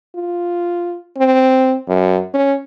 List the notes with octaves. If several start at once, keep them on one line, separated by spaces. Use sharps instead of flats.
F4
C4
F#2
C#4